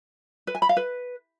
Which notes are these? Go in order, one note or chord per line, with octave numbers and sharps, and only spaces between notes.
B4
G#5
B5
F5
B4